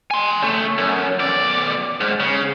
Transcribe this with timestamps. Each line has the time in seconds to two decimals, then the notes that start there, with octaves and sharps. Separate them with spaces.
0.11 G#5 C6
0.42 C#3 A3
0.78 F#2
1.19 B1 D5
2.01 G#2
2.20 C#3